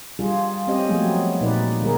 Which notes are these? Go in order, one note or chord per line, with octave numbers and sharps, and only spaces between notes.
G3 D4 F4 G#4
C4 C#4 G4 D#5
F3 F#3 G#3 A3 B3 G#4
A#2 D#4 B4 D5
D3 G#3 B3 G#4 A#4